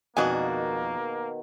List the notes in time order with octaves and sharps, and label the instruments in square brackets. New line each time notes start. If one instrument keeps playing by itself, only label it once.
[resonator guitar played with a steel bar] F2 F#4 [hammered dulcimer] B2 D#3 [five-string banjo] G#3 D4 G#5 [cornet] A#3